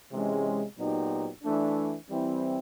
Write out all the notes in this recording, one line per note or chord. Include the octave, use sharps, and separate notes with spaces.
C3 E3 G#3 C#4
A#2 F#3 B3 D#4 G4
E3 A3 D4
E3 G3 C4 E4